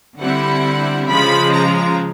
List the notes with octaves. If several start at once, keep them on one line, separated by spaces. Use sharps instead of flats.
D3 G3 C4 E4 F#5
C#3 F3 G#3 B5
A#5